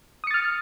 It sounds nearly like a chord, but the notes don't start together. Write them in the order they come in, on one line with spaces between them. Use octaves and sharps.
D#6 C#7 A6 F6